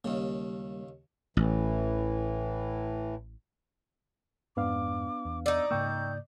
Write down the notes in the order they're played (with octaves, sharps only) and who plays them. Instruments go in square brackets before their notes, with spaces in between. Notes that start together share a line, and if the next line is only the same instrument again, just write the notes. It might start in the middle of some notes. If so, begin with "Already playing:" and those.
[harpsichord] D#2 C#3 [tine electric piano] G3 A#3
[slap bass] A1 [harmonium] A2 E3
[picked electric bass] F2 G#2 [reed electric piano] B3 D4 F5 [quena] D6
[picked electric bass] E2
[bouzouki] D#4 D5 [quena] E6
[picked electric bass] G#2 C#3 A#3 [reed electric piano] G5 C#6 E6 [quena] G6